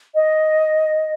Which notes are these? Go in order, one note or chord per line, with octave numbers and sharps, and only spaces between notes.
D#5